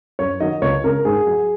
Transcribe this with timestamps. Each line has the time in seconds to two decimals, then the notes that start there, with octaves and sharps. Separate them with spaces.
0.19 F#2 C#5
0.40 D#3 F#3 D#5
0.62 C#2 C#5
0.84 C#3 G#3 A#4
1.05 G#2 G#4
1.27 F#3